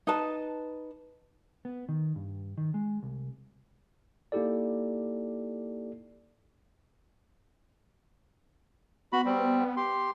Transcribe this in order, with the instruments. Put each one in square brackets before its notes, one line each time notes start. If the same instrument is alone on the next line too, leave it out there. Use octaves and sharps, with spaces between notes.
[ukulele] D#4 B4 A5
[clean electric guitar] B3
D#3
G2
D#3
G#3
C2
[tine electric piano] A#3 D#4 E4 G4 A4 D5
[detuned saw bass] B3 [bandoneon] F#4 B5
[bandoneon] G3 C4
G4 C6